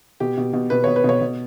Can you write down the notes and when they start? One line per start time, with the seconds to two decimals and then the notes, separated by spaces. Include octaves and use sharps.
0.20 B2 G4
0.37 B2
0.53 B2
0.70 B2 B4
0.84 B2 C#5
0.96 B4
1.04 B2 C#5
1.21 B2